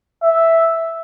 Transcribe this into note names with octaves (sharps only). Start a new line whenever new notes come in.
E5